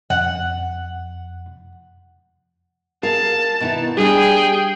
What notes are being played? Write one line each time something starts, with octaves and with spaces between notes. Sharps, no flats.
F2 F#5
G#4 A#4 F5 A5
B2 D#3 E4
G3 D4 G4 G#4 G5